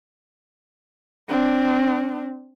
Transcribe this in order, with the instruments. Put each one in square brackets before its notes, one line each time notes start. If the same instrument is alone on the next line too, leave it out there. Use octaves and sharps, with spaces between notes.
[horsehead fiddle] C4 D4